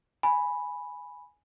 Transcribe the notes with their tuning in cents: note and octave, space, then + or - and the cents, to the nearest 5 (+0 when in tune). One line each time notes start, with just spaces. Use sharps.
G#5 +0 B5 +0